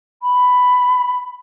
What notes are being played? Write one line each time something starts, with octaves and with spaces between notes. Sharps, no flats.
B5